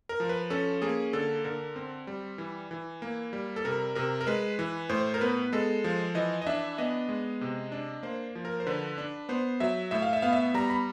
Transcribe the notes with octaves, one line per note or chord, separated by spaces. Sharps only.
A#4
F3
B4
C#4 A4
A#3 G#4
D3 A4
D3 A#4
C4
G3
E3
E3
A#3
G3
A4
C3 A#4
C3 A#4
A#4
G#3 B4
E3
A2 C5
A#4
B3 B4
G#3 A4
F3
E3 D#5
D#5
D4 E5
B3 D#5
G#3
C3
D4
A#3 C5
F3
A#4
C5
D3 B4
D4
B3 C5
F#3 E5
A2 E5
F5
E5
B3 F5
E5
G3 A#5
B5